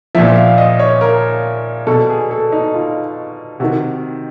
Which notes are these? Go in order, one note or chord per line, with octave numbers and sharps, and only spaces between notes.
A#2 F3 E5
F5
D#5
C#5
A#4
B2 A4
G#4
A4
D#4
F4
C3 D#3 F#4